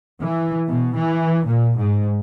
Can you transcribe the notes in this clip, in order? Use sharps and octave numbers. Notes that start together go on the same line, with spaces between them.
E3
B2
E3
A#2
G#2